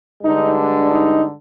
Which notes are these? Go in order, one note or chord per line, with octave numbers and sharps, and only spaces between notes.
G2 D3 G#3 D#4
D4
D#4